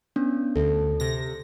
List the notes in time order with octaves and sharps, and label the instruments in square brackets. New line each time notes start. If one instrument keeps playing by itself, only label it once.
[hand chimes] B3 C#4 D4
[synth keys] D2 [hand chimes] A4
[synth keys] C3 A#6